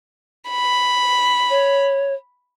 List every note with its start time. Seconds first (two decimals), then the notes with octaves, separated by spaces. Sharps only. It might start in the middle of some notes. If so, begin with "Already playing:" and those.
0.49 B5
1.50 C#5